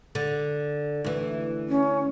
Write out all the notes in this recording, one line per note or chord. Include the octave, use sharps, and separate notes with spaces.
D3
D2 E3
C#4